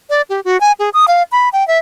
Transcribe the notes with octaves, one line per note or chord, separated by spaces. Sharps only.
D5
G4
F#4
G#5
G#4
D#6
F5
B5
G5
E5